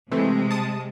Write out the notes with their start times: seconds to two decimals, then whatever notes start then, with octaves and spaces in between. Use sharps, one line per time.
0.12 C3 E3 G#3 A3 C4
0.51 A5 D#6